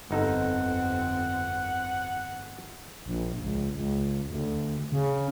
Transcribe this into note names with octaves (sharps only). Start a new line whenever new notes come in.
G1 F2 C4 D#4 A4 F#5
A#1
C#2
C#2
D2
C#3